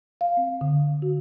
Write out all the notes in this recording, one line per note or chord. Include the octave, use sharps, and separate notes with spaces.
F5
C4
D3
F#4